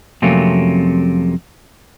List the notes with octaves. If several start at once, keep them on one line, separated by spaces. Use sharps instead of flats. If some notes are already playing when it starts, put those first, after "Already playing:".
F2 C3 F#3 A3 A#3 C#4